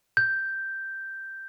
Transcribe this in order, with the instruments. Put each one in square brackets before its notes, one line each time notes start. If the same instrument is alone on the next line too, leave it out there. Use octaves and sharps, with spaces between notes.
[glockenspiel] G6